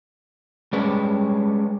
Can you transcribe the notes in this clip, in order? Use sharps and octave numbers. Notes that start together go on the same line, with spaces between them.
G3 G#3 C#4 B4